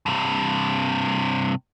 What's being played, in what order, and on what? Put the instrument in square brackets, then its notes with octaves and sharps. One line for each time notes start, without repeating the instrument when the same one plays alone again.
[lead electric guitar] G2 C3